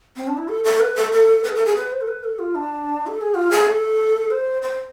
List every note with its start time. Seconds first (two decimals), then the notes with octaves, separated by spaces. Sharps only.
0.16 C4
0.28 D4
0.37 E4
0.49 A4
0.64 A4
0.80 B4
0.96 A4
1.12 A4
1.44 B4
1.49 G#4
1.55 A4
1.66 G#4
1.76 B4
1.92 C5
2.01 A4
2.08 B4
2.24 A4
2.39 F4
2.55 D4
3.07 A4
3.21 G#4
3.35 F4
3.51 G#4
3.67 A4
4.31 C5
4.62 C5